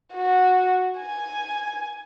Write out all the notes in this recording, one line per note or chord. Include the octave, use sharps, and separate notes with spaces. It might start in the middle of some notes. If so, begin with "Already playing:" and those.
F#4
G#5